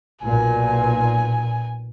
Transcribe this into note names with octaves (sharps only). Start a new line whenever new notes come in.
B1 A#2 G#5